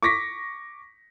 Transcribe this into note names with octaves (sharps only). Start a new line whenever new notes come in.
C#6 D6 A#6 B6